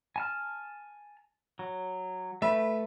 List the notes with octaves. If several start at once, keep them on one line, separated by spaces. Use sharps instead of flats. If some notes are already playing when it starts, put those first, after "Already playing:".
G#5 A5 F6
F#3
A3 B4 E5